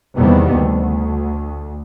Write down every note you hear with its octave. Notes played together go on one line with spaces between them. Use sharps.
E2 C3 D#3 G3 A#3 B3
D2